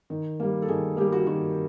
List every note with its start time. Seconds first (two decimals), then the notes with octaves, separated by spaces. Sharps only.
0.10 D#3
0.40 G3 A#3
0.62 A4
0.68 D#3 G#4
0.97 G3 A#3 G4
1.12 F#4
1.27 D#3 F#4